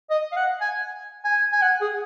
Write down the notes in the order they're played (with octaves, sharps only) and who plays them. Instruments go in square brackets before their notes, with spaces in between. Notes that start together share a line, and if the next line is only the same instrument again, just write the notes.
[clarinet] D#5
F5
F#5
G#5
G#5
G#5
F#5
G#4